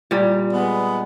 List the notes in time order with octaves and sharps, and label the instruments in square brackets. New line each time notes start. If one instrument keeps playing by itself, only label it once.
[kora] A#2 G3
[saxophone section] G#3 B3